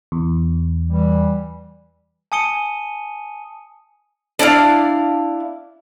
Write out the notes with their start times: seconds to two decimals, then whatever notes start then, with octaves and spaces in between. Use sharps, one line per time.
0.12 E2
0.89 E3 G3
2.32 G#5 A5 D#6 C#7 D#7 G7
4.39 D4 E4 D5 F5